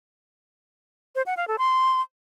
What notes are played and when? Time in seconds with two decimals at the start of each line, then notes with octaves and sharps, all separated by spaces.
1.15 C5
1.26 F#5
1.37 F5
1.48 A4
1.58 C6